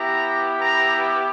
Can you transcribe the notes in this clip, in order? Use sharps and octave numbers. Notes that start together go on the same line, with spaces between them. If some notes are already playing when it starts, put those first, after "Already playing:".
Already playing: B3 E4 G4 A#5
A#5